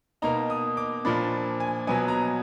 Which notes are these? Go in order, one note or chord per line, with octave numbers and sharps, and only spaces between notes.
B2 A#3 D#4 A#5
D#6
D6
A#2 F3 A#3 D4 B5
G#5
B2 F#3 B3 G#5
A#5